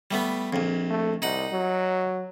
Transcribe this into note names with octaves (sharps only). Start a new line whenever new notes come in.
G3 A3 B3
A#1 F2
A3
C2 D#4 F#5
F#3